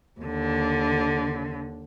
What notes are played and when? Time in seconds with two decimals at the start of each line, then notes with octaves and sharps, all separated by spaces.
0.20 D#2 D3